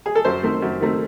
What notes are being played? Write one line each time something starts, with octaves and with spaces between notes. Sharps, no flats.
G#4
A4
F#2 C5
D#3 A3 C4
F#2
D#3 A3 C4